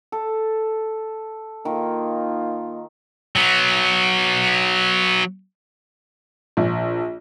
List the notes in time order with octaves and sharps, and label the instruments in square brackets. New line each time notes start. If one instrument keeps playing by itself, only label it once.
[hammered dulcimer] A4
[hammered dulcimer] D#3 [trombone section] A#3 D#4 F4
[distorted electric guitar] F#3 B3
[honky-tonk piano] A#1